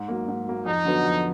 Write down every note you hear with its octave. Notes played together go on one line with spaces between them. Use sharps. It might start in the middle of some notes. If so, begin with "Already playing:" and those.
Already playing: G#2
F#3 A#3
G#2
F#3 A#3
F2 D#4
D3 F#3 B3
F2